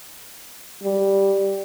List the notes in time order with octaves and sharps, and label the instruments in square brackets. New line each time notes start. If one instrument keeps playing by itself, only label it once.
[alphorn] G3